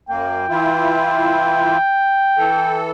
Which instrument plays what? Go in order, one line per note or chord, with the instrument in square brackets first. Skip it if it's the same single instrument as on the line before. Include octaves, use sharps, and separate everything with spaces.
[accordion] F#2 A#3 [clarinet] G5
[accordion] E3 E4 F4
E3 A4